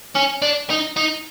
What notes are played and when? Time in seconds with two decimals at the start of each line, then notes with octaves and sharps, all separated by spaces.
0.16 C#4
0.42 D4
0.70 D#4
0.96 D#4